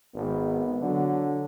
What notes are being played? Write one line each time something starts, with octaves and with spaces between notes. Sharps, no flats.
G#1 B3
D3 F#3